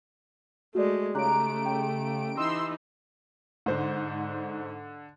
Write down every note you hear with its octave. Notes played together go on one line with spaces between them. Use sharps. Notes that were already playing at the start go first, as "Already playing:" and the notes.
G#3 A3 F#4 D5
C#3 A3 D#4 G4 A#5 F#6 D7
G5
E3 D#4 C6 D#6 E6
G#2 D3 C5